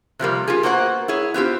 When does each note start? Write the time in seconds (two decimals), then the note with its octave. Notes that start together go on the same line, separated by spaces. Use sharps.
0.19 C3 F3 G3 A#3
0.48 F4 G4 G#4
0.63 A#3 B3 F#4 C5 F#5
1.08 E4 G#4 C#5
1.34 B3 C4 F4 G4